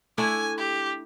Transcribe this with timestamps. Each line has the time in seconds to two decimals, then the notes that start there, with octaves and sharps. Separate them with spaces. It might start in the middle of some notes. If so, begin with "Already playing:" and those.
0.18 A3 D4 E4 G#5
0.58 G4